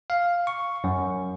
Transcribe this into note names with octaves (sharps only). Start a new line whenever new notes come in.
F5
C#6
F#2